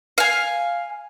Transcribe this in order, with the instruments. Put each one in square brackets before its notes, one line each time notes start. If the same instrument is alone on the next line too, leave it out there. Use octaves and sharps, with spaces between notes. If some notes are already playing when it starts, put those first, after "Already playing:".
[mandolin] F5 G#5